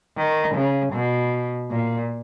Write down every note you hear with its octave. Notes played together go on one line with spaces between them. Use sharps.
D#3
C#3
B2
A#2